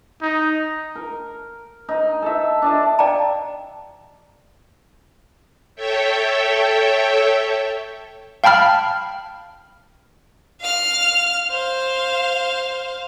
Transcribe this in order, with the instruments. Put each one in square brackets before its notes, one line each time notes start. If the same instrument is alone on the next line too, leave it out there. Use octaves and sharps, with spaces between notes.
[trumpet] D#4
[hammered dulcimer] A#4
D#4
A4 E5
D4 D#5 A5
[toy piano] D5 D#5 F5 G5 A5 A#5
[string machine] A4 C#5 E5 G5
[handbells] F5 G5 A5 B5 F6
[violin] F5 F6
C5 F5